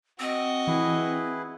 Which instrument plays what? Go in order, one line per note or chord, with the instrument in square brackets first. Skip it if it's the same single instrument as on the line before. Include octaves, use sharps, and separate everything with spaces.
[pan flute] C4 [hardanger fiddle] F#4 D#5
[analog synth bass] E3 [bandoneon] E4 G#4 B4